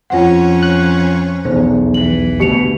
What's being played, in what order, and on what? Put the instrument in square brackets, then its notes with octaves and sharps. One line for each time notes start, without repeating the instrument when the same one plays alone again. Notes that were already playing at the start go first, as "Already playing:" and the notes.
[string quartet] F2 C#4 C#5 [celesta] F4 F#5
[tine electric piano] F#6
[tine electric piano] B1 E2 [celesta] C5
[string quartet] E3 [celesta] F#7
[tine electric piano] D2 B2 [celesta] G4 C#7 F7